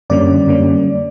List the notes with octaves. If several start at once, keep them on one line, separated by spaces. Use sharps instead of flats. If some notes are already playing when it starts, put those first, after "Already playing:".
F#2 D3 G3 A#3 C#4 D5
F#2 D3 G3 A#3 C#4